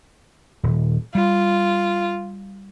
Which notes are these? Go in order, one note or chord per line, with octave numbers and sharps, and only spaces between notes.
D#1
G3 F4